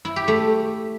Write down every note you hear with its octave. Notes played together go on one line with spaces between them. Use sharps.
E4
G4
A3